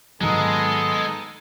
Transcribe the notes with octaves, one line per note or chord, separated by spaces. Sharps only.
G#2 D#3 F#3 G#3 B3 D#4 G#4 A4